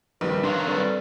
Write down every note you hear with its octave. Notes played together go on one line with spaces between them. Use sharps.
A#1 D#3 G3 B4
D#3 F#3 D4 F5 C6
G3 C4 A4 B4